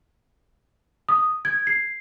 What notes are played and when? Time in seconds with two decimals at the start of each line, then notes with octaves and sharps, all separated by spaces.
1.09 D#6
1.45 G#6
1.67 C7